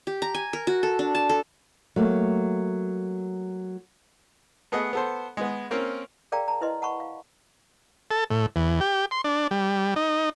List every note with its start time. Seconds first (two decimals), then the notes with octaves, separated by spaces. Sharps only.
0.07 G4
0.22 A#5
0.35 G#5
0.53 A#4
0.67 F#4
0.83 A4
0.99 D4
1.15 A5
1.29 A4
1.96 F#3 A3 A#3
4.72 A3 B3 G#4 D#5 F#5
4.93 B3 A4 C5
5.37 G#3 B3
5.71 A#3 C4 C#4 A#4
6.32 G#4 A#4 D5 F5 G5 A#5
6.48 A5 A#5
6.61 E4 B4 D#5 C6
6.82 F#5 A5 B5 C#6
7.00 F5
8.11 A4
8.30 A2
8.56 E2
8.81 G4
9.11 C6
9.24 D4
9.51 G3
9.96 D#4